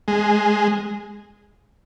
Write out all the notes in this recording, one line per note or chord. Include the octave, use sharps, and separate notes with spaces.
G#3